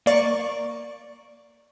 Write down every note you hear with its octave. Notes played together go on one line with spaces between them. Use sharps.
A#3 D5 C#6